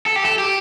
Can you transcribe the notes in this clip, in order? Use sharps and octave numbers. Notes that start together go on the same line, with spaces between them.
A4
G4
A4
G4